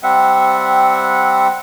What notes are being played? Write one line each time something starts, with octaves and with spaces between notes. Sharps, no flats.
G3 C4 E5 F#5